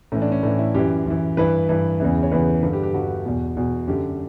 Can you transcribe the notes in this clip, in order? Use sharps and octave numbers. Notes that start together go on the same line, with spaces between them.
A2 E3 C#4
D4
C#4
A2 E3 D4
E4
F#2 E3 G4
F#2 E3
G2 E3 B4
G2 E3
E2 C#3 E3
C#5
E2 C#3 E3 B4
G2 D3 B4
G4
G4
G2 D3 F#4
E2 B2
E2 B2
F#2 D3 G4